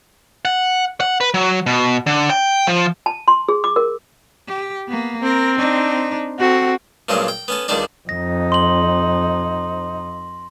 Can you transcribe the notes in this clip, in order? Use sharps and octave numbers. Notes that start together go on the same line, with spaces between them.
F#5
F#5
B4
F#3
B2
D3
G5
F3
A5
C6
G#4
D6
A#4
G4
A#3 B3
C4 A#4
D4 D#4
C4 F#4 A4
G2 A#2 F3 F#3 G#3 C#4
G5
B3 C#4 A4
C#2 D3 D#3 G3 D4 D5
F2 D#4 A#6
C6 F#7